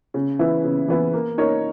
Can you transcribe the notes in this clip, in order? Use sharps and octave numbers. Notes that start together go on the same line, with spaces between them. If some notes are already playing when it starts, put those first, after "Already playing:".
C#3
E3 B3 E4
C#3
E3 B3 E4
A#3
D#4 A#4 C#5